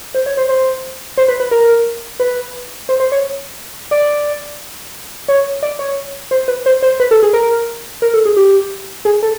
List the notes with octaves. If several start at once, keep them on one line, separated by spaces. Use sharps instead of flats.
C5
C#5
C5
C5
C5
B4
B4
A#4
B4
C5
C5
C#5
D5
C#5
D5
C#5
C5
B4
C5
C5
B4
A4
G#4
A#4
A#4
A4
G#4
G4
G#4
A4